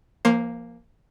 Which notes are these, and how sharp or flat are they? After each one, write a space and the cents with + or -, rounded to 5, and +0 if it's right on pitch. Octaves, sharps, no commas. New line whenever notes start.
F3 -35 A#3 +0 C5 +30